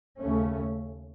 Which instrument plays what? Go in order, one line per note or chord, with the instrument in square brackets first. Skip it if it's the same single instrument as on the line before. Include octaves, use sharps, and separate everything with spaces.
[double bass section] D#2 C#3 A3 C#4